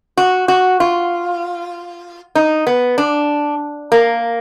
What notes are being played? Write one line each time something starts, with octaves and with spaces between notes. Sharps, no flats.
F#4
F#4
F4
D#4
B3
D4
A#3